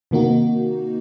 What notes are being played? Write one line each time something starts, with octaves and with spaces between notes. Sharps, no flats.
C3 D#3 A#3 D#4 F#4